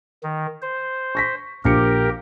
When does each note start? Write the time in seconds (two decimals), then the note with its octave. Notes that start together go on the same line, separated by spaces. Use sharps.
0.23 D#3
0.62 C5
1.15 C#6 A#6 B6
1.65 A#1 G4 A#4 D6 C#7